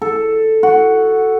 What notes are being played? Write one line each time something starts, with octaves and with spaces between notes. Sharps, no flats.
A4
F#4